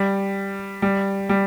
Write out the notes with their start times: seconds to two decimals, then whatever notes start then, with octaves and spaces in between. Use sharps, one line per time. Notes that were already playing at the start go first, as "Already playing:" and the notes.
Already playing: G3
0.82 G3
1.29 G3